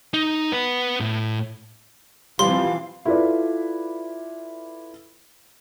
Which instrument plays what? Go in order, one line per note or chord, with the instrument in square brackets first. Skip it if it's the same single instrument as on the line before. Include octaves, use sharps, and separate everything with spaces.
[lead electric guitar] D#4
B3 B4
A2
[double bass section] E3 F3 C4 [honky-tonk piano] G3 [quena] F5 [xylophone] C6
[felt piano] E4 F4 A4 B4 D5